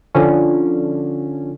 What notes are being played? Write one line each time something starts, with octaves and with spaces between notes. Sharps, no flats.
D3 F3 C#4